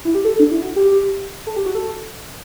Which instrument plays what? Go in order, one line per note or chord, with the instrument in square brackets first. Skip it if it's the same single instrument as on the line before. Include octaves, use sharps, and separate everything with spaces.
[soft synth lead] E4
G4
A4
D4
E4
F#4
G4
A4
G4
F#4
A4